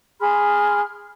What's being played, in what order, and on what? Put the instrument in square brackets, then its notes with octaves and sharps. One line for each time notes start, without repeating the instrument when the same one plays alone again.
[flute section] G#4 B5 C6 F6